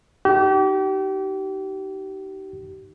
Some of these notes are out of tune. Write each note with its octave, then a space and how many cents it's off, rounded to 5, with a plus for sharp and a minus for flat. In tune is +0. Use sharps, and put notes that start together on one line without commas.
D#4 +0 G4 -35